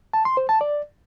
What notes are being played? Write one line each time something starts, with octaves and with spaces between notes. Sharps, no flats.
A5
C6
C5
A5
D5